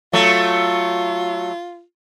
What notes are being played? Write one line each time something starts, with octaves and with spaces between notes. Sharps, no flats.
F#3 A3 F4